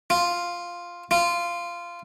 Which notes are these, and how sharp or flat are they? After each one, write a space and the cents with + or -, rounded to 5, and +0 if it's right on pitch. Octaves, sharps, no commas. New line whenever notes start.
F4 +0
F4 -15